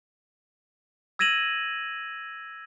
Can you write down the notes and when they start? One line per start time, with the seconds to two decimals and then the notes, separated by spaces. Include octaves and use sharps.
1.19 E6 G#6 A#6 D#7 E7 F#7